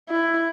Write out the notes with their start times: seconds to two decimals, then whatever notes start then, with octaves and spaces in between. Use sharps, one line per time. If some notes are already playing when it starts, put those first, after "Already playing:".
0.09 E4